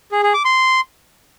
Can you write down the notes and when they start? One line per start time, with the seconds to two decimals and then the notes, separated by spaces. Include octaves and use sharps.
0.12 G#4
0.23 G#4
0.34 D6
0.45 C6